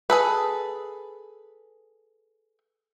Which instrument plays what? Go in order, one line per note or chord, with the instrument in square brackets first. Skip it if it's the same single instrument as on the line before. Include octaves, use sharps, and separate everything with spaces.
[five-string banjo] G#4 A4 B4